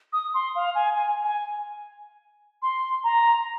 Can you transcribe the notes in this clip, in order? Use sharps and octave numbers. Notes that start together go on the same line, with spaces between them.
D#6
C6
F5
G#5
G#5
G#5
C6
A#5